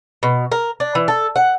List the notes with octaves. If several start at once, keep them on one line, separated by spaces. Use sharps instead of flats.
B2
A#4
D4
E3
A4
F#5